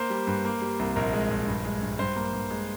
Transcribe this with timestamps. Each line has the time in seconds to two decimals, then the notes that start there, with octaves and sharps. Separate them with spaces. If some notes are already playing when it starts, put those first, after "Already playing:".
Already playing: A#3 C5
0.10 G3
0.27 G2
0.45 A#3
0.62 G3
0.79 C2
0.96 A#1 A#4
1.13 G#3
1.31 A#1
1.47 G2
1.65 G#3
1.82 G2
1.99 G2 C5
2.16 A#3
2.33 G2
2.51 G#3